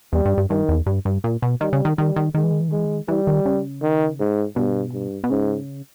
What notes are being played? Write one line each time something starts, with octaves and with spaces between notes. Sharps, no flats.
E2 G3
G2
G2
G2 D#3
E2
G2
G2
A#2
B2
D#3 G3
C#3
D#3
D#3 G3
D#3
D#3 G#3
E3
D#3
E3
D#3
E3 G#3
D#3
E3 G3
D#3
C#3
D#3
G#2
G2 B2
G2
B2
G#2 C#3